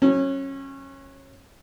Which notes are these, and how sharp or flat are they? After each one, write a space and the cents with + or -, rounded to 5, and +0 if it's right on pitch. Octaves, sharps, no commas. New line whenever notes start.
F#3 +0 C#4 -25